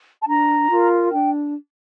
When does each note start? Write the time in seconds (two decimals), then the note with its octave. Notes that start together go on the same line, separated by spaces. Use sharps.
0.22 A5
0.27 D4 A#5
0.70 F4 A#4
1.11 D4 G5